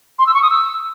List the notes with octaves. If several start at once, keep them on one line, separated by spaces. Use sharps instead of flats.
C6
E6
C#6
D#6
E6